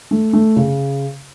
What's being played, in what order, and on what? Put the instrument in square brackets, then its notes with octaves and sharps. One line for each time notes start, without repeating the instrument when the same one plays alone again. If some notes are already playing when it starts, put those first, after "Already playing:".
[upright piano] A3
A3
C#3